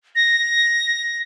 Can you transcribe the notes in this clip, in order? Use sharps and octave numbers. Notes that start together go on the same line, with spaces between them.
A#6